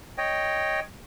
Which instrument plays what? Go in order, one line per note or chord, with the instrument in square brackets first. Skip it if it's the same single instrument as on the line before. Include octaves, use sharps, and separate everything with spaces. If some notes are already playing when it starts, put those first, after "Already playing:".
[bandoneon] C#5 D#5 G5